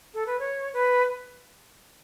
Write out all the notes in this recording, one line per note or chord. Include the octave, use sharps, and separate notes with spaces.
A4
B4
C#5
B4